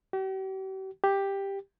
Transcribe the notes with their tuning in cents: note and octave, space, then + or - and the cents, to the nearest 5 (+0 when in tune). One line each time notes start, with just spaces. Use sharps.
G4 -45
G4 +5